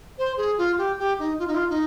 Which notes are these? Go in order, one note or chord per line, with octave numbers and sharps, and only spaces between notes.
C5
G#4
F4
G4
G4
D#4
F4
D#4
F4
D#4